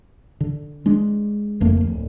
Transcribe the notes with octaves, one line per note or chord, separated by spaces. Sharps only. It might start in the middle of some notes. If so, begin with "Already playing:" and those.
D3
G#3 D4
F#1 F2 A3 A#3
D1